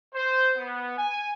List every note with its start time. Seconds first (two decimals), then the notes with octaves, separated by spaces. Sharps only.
0.14 C5
0.57 B3
0.98 G#5